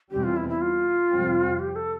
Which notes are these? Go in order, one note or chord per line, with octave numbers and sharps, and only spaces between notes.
E2 B2 G3 C4 G4
F4
E4
E4
F4
F2 C3 G3 C4
G4
A4